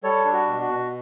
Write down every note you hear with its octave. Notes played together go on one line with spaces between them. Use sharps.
G3 A4 C#5
D4
F#4
B2
F#4
B2